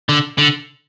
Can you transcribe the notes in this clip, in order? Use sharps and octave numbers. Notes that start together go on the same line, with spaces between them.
D3
D3